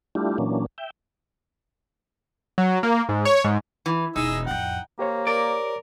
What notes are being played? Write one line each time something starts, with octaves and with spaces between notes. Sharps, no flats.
G3 A3 D4 E4 F4 G4
A#2 E3 F#3 A#3 C#4 D4
E5 G5
F#3
A#3
G#2
C#5
G#2
E3
E1 D#4 G#4 D#5 E6
A1 F2 F#5 G5
A#3 G4 C5 C#5
A#4 D5